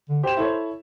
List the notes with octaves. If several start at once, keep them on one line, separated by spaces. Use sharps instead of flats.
D3
G4 C5 E7
E4 A4 C#5